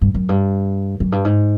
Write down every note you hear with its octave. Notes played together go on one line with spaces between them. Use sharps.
G2
F#2
G2
F#2
G2
G#2